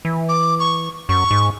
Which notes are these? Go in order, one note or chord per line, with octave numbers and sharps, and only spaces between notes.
E3
D6
C#6
F#2 C#6
G#2